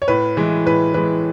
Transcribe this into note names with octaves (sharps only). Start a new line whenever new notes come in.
C#5
A2 B4
E3 G#3
A2 B4
E3 G#3 B4